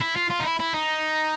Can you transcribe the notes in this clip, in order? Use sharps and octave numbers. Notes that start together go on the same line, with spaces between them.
E4
F4
F4
D#4
E4
E4
D#4